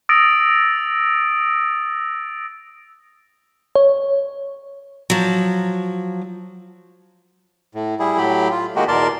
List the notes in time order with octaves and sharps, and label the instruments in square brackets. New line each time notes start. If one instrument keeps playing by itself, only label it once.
[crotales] D#6 E6 A6 A#6 D7
[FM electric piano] C#5
[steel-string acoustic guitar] F3 F#3
[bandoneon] A2
G3 E4 G#4
A2 F#3 G4 B5
F4
D#3 G#3 A#3 F#4 G4
E2 B2 A#4 D5 A5 C6